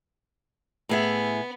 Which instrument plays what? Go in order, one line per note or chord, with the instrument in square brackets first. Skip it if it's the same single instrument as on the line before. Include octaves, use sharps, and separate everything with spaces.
[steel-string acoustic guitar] A2 G#4 E5 [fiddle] B3